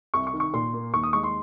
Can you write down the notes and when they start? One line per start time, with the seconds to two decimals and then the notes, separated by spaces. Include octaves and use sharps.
0.14 C2 C#6
0.27 C#6
0.34 D#3
0.40 C#6
0.54 A#2 C6
0.73 A#3
0.93 D#2 C#6
1.03 D#6
1.13 G#3 C#6
1.23 C6